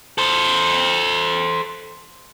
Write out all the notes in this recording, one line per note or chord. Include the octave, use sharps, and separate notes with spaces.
A4 C5